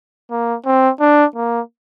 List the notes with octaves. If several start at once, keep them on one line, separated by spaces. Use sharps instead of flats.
A#3
C4
D4
A#3